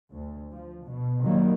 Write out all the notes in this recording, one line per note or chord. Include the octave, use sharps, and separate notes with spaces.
D2
F3
B2
F1 D#3 F#3 G3 A#3